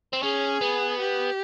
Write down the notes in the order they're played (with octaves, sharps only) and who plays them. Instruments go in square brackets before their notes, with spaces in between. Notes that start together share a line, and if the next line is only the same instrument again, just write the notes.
[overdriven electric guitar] C4
[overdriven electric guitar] C#4 [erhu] G#4
[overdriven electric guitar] B3
[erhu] G4